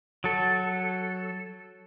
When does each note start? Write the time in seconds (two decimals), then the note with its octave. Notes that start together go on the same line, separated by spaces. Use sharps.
0.24 F#3 A4